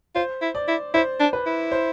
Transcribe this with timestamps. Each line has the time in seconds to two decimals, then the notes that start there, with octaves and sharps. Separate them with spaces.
0.15 F4 C5
0.42 E4
0.55 D5
0.68 E4
0.94 E4 C5
1.20 D4
1.33 B4
1.46 E4
1.72 C5